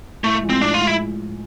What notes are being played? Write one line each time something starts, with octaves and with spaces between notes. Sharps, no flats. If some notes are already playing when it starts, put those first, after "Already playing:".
A2 A3
F3 G#3
C4
A2 D4
F4
F3 G#3
E4